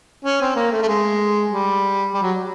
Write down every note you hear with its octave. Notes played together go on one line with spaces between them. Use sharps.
C#4
C4
A#3
A3
A3
G#3
G3
G3
F#3